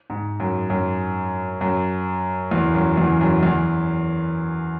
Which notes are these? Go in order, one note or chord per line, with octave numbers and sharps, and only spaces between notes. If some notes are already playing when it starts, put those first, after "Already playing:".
G#2
F#2
F#2
F#2
E2
F#2
E2
F#2
E2